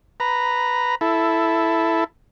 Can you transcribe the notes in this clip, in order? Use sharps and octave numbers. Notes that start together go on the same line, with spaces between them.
B4 A#5
E4 A4